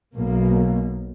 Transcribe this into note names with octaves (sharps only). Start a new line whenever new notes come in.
B1 B2 A#3